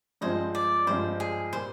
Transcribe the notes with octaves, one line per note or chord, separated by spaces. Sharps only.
G2 F3 G#3 C4 C5 D#5
D5
G2 F3 G#3 C4 C5
G#4
A#2 G3 A#3 C5